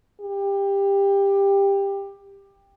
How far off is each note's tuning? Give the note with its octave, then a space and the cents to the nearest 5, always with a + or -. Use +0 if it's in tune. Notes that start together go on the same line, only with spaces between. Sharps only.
G4 +15